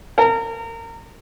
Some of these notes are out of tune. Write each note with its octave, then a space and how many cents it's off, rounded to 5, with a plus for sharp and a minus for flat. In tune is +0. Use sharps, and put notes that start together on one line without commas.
A#4 -30